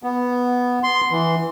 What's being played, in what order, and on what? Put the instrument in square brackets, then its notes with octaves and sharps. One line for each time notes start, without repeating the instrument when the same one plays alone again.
[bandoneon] B3
C6
E3